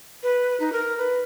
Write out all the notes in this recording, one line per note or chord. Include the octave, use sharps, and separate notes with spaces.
B4
D#4
A#4
B4